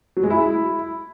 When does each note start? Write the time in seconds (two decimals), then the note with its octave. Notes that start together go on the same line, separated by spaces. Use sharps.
0.17 F#3
0.23 G#3
0.30 E4